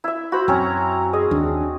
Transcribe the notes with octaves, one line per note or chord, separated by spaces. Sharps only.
E4 E5
F#4 C5 B5
F#2 C4 C#4 E4 C#5 A#5
G#4 D#5
D#2 D4